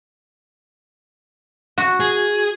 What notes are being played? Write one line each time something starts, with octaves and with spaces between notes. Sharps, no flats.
F#4
G#4